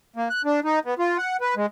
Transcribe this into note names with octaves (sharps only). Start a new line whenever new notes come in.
A#3
F#6
D4
D#4
B3
F4
F#5
B4
G#3